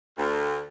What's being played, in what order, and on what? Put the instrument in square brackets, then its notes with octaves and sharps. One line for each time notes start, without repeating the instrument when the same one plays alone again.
[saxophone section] D2